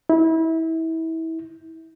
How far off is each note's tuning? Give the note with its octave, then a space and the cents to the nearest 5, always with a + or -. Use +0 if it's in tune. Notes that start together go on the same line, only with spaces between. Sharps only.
E4 -30